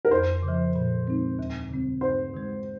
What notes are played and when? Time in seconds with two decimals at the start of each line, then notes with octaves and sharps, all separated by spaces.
0.05 A#4
0.11 F2 C5
0.43 C#3
0.48 F3
0.76 A#2
1.07 G#3 C4 D#4
1.39 D#2
1.69 C#3 G3 C4
2.01 G2 C5
2.34 D#3 G#3